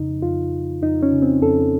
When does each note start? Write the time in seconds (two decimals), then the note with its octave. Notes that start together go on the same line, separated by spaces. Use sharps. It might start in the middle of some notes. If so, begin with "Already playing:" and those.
Already playing: F2 C#3 D#4
0.22 F2 F4
0.52 F2
0.82 F2 D#4
1.03 C#4
1.13 C#3
1.22 C4
1.42 F2 A4